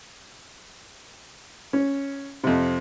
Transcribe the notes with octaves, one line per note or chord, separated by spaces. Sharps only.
C#4
F2 C3